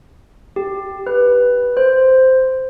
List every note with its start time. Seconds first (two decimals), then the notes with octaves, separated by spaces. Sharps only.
0.56 G4
1.07 B4
1.77 C5